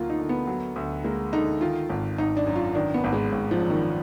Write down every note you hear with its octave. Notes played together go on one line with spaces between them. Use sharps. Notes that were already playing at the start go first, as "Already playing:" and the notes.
Already playing: D2 F#3 A#3 F4
D#4
D3
B3
F#3
D2
G#3 A#3
D3 D#4
D#3 F4
G#1
G#1 D#4
D4
F#2
F4
D#3 D4
B3
G#1
G#3
G#1
F3
F#2
D#3